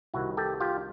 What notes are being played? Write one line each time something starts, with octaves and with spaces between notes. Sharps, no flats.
C2 C3 D#3 E4 F#4
G4 A4
F4 G4